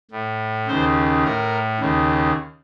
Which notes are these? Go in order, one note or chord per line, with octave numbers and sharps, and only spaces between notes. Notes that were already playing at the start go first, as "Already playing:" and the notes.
A2
D#2 C#3 C5
A2 A#4
D#2 C#3